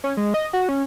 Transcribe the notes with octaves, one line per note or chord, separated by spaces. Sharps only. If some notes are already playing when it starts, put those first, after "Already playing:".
C#4
G#3
D#5
F#4
C#4